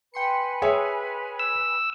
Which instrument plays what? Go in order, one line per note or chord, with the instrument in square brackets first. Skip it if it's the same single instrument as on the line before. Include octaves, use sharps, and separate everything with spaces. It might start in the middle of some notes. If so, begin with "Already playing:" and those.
[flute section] B4 G#5 B5 [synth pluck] G5 C6 C#7
[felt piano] G#4 C#5 E5
[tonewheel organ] E6